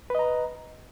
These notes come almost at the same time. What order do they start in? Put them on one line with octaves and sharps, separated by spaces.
B4 D#5 A#5